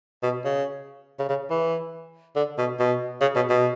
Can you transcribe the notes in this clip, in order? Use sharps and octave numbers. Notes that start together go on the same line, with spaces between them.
B2
C#3
C#3
C#3
E3
D3
B2
B2
C#3
B2
B2